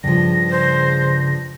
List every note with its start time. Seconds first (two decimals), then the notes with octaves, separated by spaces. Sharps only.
0.04 G2 C#3 F3 A#6
0.50 C5